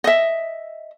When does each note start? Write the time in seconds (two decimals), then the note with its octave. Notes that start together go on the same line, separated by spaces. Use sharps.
0.04 D#5 E5